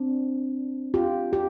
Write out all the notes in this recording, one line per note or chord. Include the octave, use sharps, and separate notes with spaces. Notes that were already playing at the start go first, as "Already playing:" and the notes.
Already playing: C4 D4
F4 G4
G4